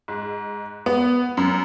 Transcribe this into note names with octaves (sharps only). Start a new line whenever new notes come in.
G#2
B3
F#2